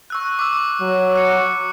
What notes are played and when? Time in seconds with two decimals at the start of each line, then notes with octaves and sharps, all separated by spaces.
0.10 C#6 E6 F#6
0.39 D6 E6
0.81 F#3
1.16 F#6 C#7